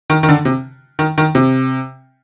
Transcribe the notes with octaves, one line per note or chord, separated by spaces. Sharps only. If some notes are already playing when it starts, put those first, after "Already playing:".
D#3
D#3
D3
C3
D#3
D#3
C3